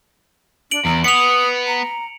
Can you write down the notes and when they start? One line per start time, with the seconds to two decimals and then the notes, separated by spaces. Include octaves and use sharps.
0.71 D4 D7 F#7
0.85 E2 A#5
1.04 B3 D#6 C#7 F7
1.67 A#5